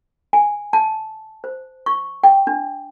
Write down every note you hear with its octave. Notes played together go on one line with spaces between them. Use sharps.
G#5
A5
C5
C#6
G5
D4